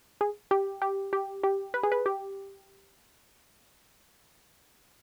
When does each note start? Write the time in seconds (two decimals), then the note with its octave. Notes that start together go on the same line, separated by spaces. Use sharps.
0.21 G#4
0.51 G4
0.82 G4
1.13 G4
1.43 G4
1.74 B4
1.83 G#4
1.92 B4
2.06 G4